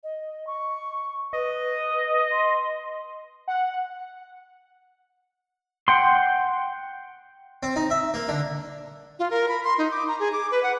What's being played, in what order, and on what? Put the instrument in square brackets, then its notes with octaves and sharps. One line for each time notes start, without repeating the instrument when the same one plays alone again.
[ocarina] D#5
C#6
[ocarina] B4 [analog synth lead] D#5
[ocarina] C6
[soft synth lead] F#5
[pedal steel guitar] F#5 G5 C6
[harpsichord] C4
D#4
E5
A#3
D3
[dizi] F4
A#4
B5
C6
D#4
D6
A#5
G#4
D6
B4
F#5